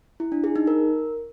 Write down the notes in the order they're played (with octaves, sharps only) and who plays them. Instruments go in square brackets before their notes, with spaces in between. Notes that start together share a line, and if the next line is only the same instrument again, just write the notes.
[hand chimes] E4
D4
G#4
D#4
A#4